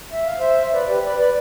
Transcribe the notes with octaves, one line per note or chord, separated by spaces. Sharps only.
E5
F5
C5 E5
E5
B4 D5
G4 B4
B4 D5
B4 D5